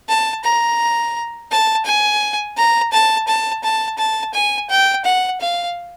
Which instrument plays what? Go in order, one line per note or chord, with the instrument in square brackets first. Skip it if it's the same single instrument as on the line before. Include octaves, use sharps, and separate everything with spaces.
[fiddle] A5
A#5
A5
G#5
A#5
A5
A5
A5
A5
G#5
G5
F#5
F5